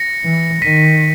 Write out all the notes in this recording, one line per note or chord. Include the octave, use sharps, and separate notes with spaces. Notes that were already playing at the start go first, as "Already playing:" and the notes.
Already playing: A#6 C#7
E3
D#3 B6 D#7